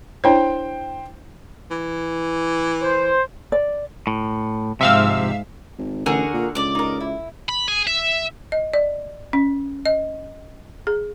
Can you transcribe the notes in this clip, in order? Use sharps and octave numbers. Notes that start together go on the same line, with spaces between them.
D4 E4 C5 C#5 G5
E3
C5
D5
A2
G#2 C3 F3 C4 E5 F5 E6
G#1
A1 D3 F#4 G#4 A#4
A#2
C#2 D5 D6
D#4 A#4
E4
B5
G#4
E5
D#5
D5
C#4
D#5
G#4